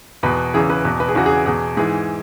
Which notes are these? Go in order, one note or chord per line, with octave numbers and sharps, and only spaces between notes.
E2 B2 B4
E2 C#3 E3 G#4
B4
E2 B2 B4
B4
G#4
E2 C#3 E3 F#4
G#4
E2 B2 G#4
G#2 E3 G#4